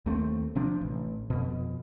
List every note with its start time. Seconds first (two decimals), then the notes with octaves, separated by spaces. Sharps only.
0.06 D#2 A3 B3 C4
0.55 C3 F3 C4 D4
0.81 A1
1.30 F2 B2